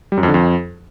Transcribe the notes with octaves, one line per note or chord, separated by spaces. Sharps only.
G3
F#2
F2
D3
F2